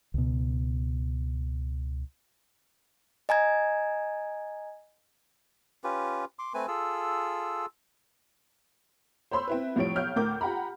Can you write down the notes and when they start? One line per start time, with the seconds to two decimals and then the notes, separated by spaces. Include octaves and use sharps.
0.14 C#2 B2
3.29 D#5 G#5 A#5 G#6
5.84 C#4 F4 G4 B4
6.39 C6 D6
6.54 A3 C4 B4 G#5
6.68 F4 G#4 A4 E6
9.31 C5 C#5 B5 C6 E6
9.47 C4 E4 B4
9.76 C2 A2 F3 C#5 D7
9.96 B1 C#5 F6 G6
10.16 D2 A2 A#4 D6 G6
10.41 F4 G4 F#5 A#5 B5